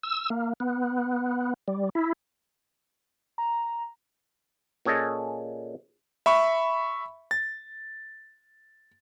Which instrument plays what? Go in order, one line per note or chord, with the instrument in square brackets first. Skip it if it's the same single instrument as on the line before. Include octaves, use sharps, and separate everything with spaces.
[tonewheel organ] E6
A#3
B3
G3
E4
[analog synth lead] A#5
[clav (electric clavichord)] A#2 C#4 G#4 A4 D#5
[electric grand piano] E5 B5 C#6
A6